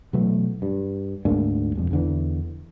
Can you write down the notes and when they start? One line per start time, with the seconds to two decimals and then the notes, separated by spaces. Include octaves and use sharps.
0.13 B2 E3 F#3 A3
0.62 G2
1.25 D2 G#2 A#3 D4
1.75 E1 F2
1.91 E2 D3 E3